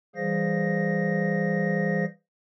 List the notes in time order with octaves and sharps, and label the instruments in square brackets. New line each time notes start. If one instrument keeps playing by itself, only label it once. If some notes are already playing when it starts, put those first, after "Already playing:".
[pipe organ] E3 G3 G#4 C5 F5 A#6